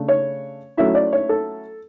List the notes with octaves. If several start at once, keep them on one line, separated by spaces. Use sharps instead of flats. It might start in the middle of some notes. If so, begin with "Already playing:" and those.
Already playing: C#3 A3 D4
C#5
F#3 A3 C#4 E4 E5
D5
C#5
A4